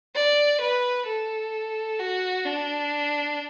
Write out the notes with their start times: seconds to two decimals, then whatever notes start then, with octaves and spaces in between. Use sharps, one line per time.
0.15 D5
0.61 B4
1.07 A4
1.99 F#4
2.45 D4